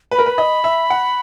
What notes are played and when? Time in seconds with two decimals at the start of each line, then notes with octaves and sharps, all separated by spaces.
0.11 B4 B5
0.18 A#4
0.26 B4
0.38 D#5
0.64 E5
0.90 F#5